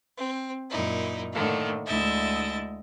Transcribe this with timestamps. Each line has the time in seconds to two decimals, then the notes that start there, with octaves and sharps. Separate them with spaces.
0.17 C4
0.69 F#2 A#2 D#4 E4
1.32 A2 D3 D#3 A3 A#3
1.85 D2 G#3 E4 D#5 E5 A6